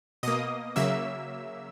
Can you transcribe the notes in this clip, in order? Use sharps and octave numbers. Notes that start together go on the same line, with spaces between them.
B2 A#3 D#5 D#6
C#3 F#3 A#3 E5 E6